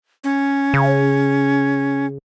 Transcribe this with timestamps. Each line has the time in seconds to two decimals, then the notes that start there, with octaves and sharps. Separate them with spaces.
0.24 C#4
0.74 C#3